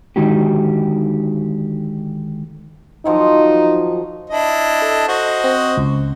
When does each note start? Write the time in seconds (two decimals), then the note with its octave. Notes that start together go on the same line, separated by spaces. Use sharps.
0.16 D3 D#3 G#3 D#4 F#4 G4
3.05 D#3 F3 F#3 D#4
4.30 D4 E4 D#5
4.82 A4
5.08 F#4 C5 D#5
5.44 C4
5.77 C#2